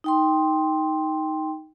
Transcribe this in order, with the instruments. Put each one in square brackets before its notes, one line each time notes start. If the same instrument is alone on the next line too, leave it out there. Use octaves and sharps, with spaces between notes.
[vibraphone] D#4 G5 C6